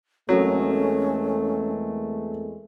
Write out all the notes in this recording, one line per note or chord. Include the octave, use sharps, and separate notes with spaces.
E2 F#3 G#3 A3 C4 C#4 A4 A#4